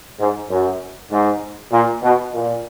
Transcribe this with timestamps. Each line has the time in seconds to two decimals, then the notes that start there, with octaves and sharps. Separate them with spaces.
0.19 G#2
0.49 F#2
1.11 G#2
1.72 A#2
2.03 B2
2.34 A#2